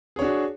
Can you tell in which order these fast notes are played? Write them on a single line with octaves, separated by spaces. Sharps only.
G#4 C#5 D4 F#4